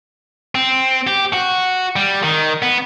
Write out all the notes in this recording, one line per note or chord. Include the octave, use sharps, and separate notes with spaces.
C4
G4
F#4
G3
D#3
B3